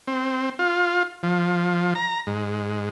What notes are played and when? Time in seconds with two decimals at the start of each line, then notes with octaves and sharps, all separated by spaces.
0.07 C4
0.59 F4
1.23 F3
1.95 A#5
2.27 G#2